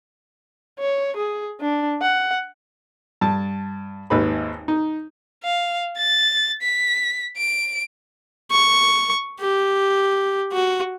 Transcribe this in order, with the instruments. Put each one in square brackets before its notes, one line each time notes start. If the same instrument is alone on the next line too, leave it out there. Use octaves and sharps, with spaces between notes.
[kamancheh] C#5
G#4
D4
F#5
[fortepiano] G2 A5
G#1 D#2 B4 B5
D#4
[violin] F5
A6
B6
D7
[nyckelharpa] C#6
G4
F#4